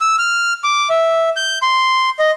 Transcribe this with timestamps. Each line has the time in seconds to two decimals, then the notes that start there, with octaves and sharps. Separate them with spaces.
0.01 E6
0.19 F6
0.64 D6
0.90 E5
1.36 G6
1.62 C6
2.19 D#5